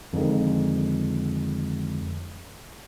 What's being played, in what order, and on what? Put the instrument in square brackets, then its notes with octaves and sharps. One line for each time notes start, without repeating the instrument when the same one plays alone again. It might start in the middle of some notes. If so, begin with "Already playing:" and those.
[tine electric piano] F2 D3 D#3 G#3